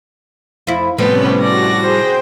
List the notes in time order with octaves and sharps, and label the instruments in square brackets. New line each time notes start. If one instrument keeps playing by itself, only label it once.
[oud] F2 E4
[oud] A2 F3 G3 [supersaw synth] C3 C#4 [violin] B3 B4
[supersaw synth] F#4 [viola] D5 [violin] A#6
[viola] G#4 C5 [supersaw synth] G5